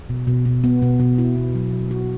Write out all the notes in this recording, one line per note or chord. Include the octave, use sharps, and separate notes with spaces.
B2
B2
B2
B3
B2
B2
E4
B3
F#3
F#3
F#4